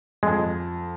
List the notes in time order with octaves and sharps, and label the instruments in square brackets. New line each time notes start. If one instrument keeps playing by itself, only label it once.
[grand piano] F2 [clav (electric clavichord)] G#3